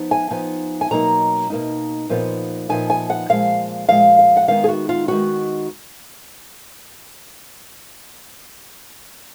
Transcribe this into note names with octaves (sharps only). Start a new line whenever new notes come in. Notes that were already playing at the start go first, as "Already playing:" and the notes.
Already playing: F3 B3 D#4
G#5
F3 B3 D#4 G#5
G#5
B2 F#3 A#3 D#4 A#5
B2 F#3 A#3 D#4
A#2 F3 B3 D#4
A#2 F3 B3 D#4 G#5
G#5
F#5
A#2 F3 G#3 F5
A#2 F3 G#3 F5
F5
F#5
D#3 G#3 B3 D#4 F5
G#4
F#4
F4
D#3 G#3 B3 D#4 F#4